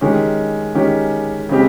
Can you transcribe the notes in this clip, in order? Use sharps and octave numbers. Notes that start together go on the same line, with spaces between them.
D#3 G#3 C#4 G4
D#3 G#3 C#4 G4
C#3 G#3 C4 G4